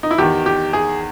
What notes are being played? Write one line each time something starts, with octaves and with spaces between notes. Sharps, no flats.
D#4
E4
E2 D#3 G4
G4
G#4